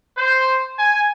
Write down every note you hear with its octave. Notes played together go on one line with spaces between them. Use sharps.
C5
G#5